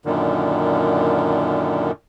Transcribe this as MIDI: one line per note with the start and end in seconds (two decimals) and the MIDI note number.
0.05 1.91 42
0.05 1.91 46
0.05 1.91 50
0.05 1.91 51